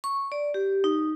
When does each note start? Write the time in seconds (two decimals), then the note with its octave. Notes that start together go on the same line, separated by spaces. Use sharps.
0.04 C#6
0.32 D5
0.54 G4
0.84 D#4